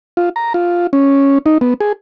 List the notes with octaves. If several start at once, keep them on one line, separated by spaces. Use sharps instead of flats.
F4
A#5
F4
C#4
D#4
B3
G#4